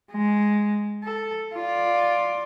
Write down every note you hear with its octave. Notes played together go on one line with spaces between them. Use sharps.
G#3
A4
F4 D5